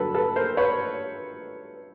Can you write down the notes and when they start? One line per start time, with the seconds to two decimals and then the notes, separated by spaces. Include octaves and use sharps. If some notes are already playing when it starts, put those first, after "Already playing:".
Already playing: G2 D3 F#3 A4 B4
0.15 A4 B4
0.36 A#4 C5
0.57 B4 C#5